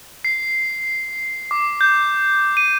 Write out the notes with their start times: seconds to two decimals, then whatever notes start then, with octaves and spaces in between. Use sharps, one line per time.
0.25 C7
1.51 D6
1.81 G6
2.57 D#7